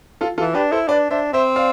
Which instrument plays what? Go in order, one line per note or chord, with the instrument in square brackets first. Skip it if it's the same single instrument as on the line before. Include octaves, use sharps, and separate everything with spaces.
[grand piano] F4 A4
[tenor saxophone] E3 [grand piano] F4 A4
[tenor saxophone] D4 [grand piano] G4 B4
[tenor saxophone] E4 [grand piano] A4 C5
[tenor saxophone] D4 [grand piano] B4 D5
[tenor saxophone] D4 [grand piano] C5 E5
[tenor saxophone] C4 [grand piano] C5 E5
[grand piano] D5 F5